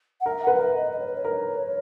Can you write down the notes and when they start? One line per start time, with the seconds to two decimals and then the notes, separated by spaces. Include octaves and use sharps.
0.20 F#5
0.26 A#4 E5
0.42 F#5
0.47 B4
0.54 F#5
0.59 A#4 E5
0.75 D#5
0.91 D#5
0.99 C#5
1.06 B4
1.13 C#5
1.25 A#4